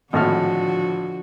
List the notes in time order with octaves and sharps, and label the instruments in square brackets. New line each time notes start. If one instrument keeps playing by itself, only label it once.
[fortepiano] G#1 A2 F6 [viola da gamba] D3 F3 F#4